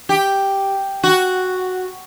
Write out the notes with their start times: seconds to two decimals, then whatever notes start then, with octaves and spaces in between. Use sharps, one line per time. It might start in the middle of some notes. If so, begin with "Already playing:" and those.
0.09 G4
1.03 F#4